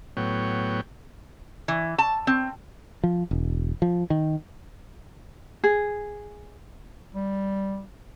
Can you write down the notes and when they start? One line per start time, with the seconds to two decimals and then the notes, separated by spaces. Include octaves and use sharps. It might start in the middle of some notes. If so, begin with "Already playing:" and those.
0.17 A2 F#3 B3 C#5 G5
1.68 E3
1.98 A5
2.27 C4
3.04 F3
3.31 E1
3.82 F3
4.10 D#3
5.64 G#4
7.15 G3